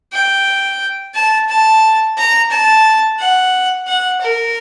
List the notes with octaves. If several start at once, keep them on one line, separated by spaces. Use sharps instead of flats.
G5
A5
A5
A#5
A5
F#5
F#5
A#4